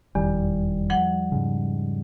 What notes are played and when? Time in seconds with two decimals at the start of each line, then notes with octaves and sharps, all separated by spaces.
0.15 F1 E2 D#3 G3
0.90 F3 F#5
1.32 G#2 C#3